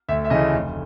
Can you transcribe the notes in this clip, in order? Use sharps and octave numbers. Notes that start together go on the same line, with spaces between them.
D2 E5
E5
C#3 E3 A3 D#5
F1